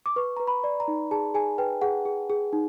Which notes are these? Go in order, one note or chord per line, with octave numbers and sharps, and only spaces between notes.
D6
B4 C#6
B4 A#5
B5
D5
A#5
D#4
G#4 A5
G#4 G#5
B4 G5
G#4 F#5
G#4
G#4
D#4